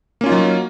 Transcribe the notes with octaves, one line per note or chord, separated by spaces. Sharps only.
F#3 A#3 C#4 D#4 F4